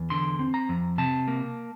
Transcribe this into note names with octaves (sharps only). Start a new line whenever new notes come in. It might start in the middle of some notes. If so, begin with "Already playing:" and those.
Already playing: E2
D3 C6
C4
A#5
F2
C3 A5
A#3